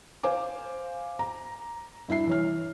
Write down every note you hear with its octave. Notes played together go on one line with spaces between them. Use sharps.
C5 F5 G#5 D6
A#5
G2 E4 E5 C7
E3 C#5 F6